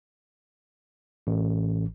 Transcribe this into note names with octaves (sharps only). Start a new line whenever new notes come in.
A1